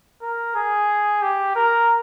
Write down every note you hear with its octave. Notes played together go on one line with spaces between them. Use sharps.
A#4
G#4
G4
A#4